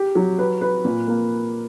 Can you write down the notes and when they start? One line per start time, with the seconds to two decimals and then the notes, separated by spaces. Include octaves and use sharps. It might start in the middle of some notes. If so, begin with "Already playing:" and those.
Already playing: G4
0.15 F#3
0.38 B4
0.61 B4
0.85 A#2
1.08 A#3